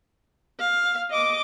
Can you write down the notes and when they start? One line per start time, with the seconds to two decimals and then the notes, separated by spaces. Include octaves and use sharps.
0.59 F5
1.11 D#5 D6